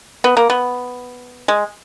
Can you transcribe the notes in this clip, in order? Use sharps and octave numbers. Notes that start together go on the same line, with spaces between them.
B3
A#3
B3
G#3